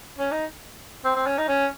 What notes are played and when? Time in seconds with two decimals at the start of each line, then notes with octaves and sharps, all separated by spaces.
0.17 C#4
0.32 D#4
1.04 C4
1.15 C4
1.26 C#4
1.38 D#4
1.48 C#4